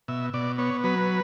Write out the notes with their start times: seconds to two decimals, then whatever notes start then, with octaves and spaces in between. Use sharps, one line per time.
0.08 B2 E5
0.34 B2 D5
0.58 B3 C#5
0.84 F#3 B4